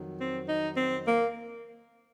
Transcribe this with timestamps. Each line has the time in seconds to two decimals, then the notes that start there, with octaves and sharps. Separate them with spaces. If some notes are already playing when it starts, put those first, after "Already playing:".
Already playing: F2 D#3 F#3
0.19 C4
0.47 D#4
0.76 C4
1.05 A#3